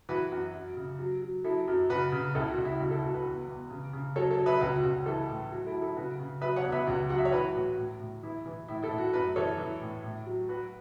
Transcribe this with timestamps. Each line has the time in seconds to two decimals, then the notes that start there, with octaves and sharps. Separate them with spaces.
0.09 E3 F#4 B4
0.31 F#2 F#4
0.54 F#2
0.76 C#3
0.99 F#3
1.22 F#3
1.44 F#3 E4 A4
1.68 F#2
1.89 C#3 F#4 B4
2.12 C#3
2.35 C#2 E4 A4
2.50 F#4
2.58 C#2
2.65 E4
2.80 C#2 F#4
2.91 E4 A4
3.03 C#2 F#4
3.14 F#4 B4
3.26 E2
3.48 E2
3.71 C#3
3.93 C#3
4.16 F#3 A4 C#5
4.31 A4 C#5
4.39 F#3
4.46 B4 E5
4.61 C#2 F#4 B4
4.76 F#4
4.84 C#2
5.06 E3 E4 A4
5.29 A2
5.52 F#3 F#4
5.66 E4 A4
5.74 F#3
5.81 E4 A4
5.97 C#3 F#4 B4
6.20 C#3
6.41 F#3 B4 E5
6.56 C#5 F#5
6.64 E2
6.72 B4 E5
6.87 C#2 F#4
7.09 F#3 F#5
7.18 E5
7.25 C#5
7.32 E3 F#4 B4
7.55 A2 F#4
7.78 A2
8.00 A2
8.23 E3 E4
8.46 E3
8.68 A2 E4
8.83 E4 A4
8.91 A2
8.98 F#4
9.13 F#2 F#4 B4
9.36 E3 A4 C#5
9.58 E3
9.81 A2
10.04 A2
10.26 F#3
10.49 F#3 F#4 B4